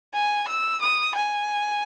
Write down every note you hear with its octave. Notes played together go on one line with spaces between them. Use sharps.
G#5
E6
D#6
G#5